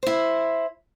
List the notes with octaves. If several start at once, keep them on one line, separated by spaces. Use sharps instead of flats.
E4 C5